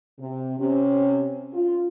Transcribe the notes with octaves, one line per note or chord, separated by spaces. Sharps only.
C3
C3 C#4
F4